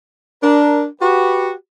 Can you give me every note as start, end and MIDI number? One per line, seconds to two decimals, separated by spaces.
0.42 0.84 62
0.42 0.84 70
1.01 1.52 66
1.01 1.52 67
1.01 1.52 71